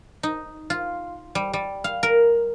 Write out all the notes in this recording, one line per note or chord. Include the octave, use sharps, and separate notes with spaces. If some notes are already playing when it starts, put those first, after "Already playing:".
D#4
F4
G3
G3
F5
A#4